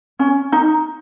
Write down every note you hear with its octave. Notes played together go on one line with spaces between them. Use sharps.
C#4
D#4